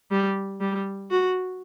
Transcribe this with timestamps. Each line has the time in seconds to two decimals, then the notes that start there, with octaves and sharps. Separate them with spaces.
0.11 G3
0.60 G3
1.10 F#4